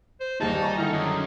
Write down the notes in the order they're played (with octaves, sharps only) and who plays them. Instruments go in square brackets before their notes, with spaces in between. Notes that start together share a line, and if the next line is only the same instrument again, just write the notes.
[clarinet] C5
[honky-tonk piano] G1 D#2 G#4 [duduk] G3 [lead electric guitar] D#4 [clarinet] A5
[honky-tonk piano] G#5 A#5 C#6
[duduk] D3 [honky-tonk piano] D#3 E4 [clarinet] F6
[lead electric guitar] F#2 [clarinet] G#4